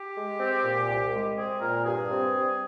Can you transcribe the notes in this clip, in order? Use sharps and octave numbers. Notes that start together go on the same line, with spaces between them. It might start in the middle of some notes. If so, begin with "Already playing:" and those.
Already playing: G4
G#3
C4
A#2
C2
G#3
C4 G#4
A#2 A#4
G2 G#4
C4
G2